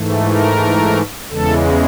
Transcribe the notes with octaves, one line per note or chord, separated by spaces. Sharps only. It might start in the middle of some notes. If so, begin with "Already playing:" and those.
Already playing: G#2 E3 A3
A#4
E2 C#3 E3 G#3 A4